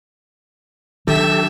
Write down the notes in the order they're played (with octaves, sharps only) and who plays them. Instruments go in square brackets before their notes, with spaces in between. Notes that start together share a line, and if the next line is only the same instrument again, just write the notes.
[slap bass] D#3 F#3 D4 [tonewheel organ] G4 A4 [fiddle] E5